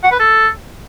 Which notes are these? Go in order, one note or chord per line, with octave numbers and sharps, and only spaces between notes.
F#5
B4
A4